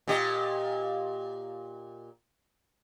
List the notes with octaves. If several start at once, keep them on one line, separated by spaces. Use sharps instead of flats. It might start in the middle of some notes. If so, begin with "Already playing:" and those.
A#2 G4 D#5